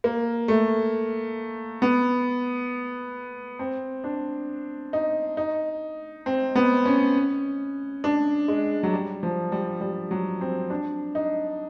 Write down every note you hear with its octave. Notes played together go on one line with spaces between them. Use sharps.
A#3
A3
B3
C4
D4
D#4
D#4
C4
B3
C#4
D4
G#3
F#3
G3
F3
G3
G3
F#3
C4
D4
D#4